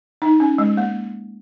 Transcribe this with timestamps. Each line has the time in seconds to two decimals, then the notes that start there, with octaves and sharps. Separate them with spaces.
0.22 D#4
0.40 C#4
0.58 G#3
0.77 A#3